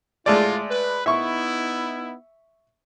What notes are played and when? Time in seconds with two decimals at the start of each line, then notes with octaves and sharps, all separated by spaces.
0.26 A2 G#3 A3 E4 F4 D5
0.71 B4
1.06 B3 D#4 E4 E5 C#6